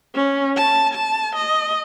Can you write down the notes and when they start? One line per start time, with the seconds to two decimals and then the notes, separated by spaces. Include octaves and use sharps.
0.15 C#4
0.57 A5
0.93 A5
1.35 D#5